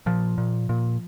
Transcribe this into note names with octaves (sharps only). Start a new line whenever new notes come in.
A#2 F3
A#2
A#2